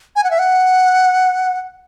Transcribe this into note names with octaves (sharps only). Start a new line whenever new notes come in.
G#5
F#5
E5
F#5